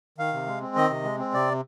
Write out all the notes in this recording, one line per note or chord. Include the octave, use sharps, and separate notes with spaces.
D#3 F5
C3
G#3
C4
D#3 D#5
C3
G#3
C4
C3 D5